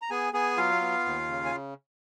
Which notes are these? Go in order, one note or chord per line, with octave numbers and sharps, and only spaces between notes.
A#5
B3 G#4 G#5
B3 G#4 G#5
F#3 F4 F5
B3
D#2
C#3
G#5